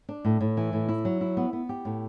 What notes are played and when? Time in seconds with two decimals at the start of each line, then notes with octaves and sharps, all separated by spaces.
0.09 D4
0.25 A2
0.41 A2
0.57 E3
0.73 A2
0.89 E4
1.05 F#3
1.21 E4
1.37 B3
1.53 B3
1.69 G4
1.85 A2